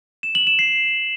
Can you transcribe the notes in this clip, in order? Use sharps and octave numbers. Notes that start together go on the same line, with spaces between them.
E7
F#7
E7
C7